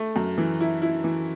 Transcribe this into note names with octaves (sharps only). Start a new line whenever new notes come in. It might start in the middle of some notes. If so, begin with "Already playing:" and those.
Already playing: A3
F#2
E3
E4
E4
E3